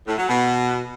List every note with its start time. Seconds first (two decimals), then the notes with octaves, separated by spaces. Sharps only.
0.07 A2
0.18 F#3
0.29 B2